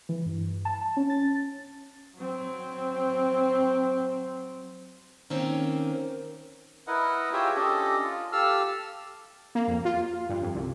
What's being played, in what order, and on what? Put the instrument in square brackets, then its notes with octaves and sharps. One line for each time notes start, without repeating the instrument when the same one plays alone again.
[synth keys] E3
G2
A5
C#4
A6
[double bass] F#3 C4
[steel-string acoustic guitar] D#2 D#3 A#3 C4 C#4
[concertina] E4 A#4 B4 D#5 F#5
F4 G4 G#4 C#5 E5 G5
C#4 D4 G4 A4 D#5
F4
G4 A4 F5 E6 F6
[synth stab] A#3
F2
F4
G2
F2
C2